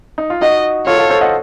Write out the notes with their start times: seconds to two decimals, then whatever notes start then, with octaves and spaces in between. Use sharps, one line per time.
0.18 D#4
0.30 F4
0.42 D#4 F#4 D#5
0.86 F4 A4 C#5
0.98 F4 A4
1.10 A4 C5
1.21 D#5 F#5